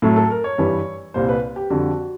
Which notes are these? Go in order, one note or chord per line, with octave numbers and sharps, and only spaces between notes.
A2 F#3 A3 A4
A4
A#4
C#5
G2 E3 G3
C2 A#2 G3 C5
B4
G4
F2 D3 G3 F#4